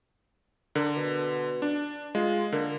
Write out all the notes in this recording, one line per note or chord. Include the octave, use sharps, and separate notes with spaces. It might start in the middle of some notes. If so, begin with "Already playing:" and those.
D3 A#4
B2
D4
G#3 F4
D3 A#3